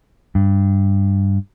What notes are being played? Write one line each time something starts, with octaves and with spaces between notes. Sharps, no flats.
G2